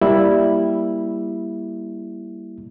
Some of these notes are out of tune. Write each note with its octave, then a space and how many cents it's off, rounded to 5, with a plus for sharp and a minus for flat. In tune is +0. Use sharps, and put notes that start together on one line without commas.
G3 +0 A#3 +15 E4 +0